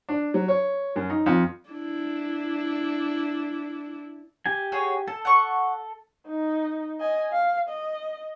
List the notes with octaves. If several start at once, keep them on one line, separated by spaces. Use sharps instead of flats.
D4
F#3
C#5
F#2
D#4
F2
D4 E4
G4 G#5
F#4 G#4 C#5
A4 A5
F#5 C#6
D#4
D#5 G#5
F5
D#5